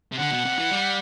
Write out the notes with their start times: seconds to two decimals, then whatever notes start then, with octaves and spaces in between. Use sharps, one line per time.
0.12 C3
0.18 D3 F#5
0.32 B2
0.45 C3
0.58 E3
0.71 G3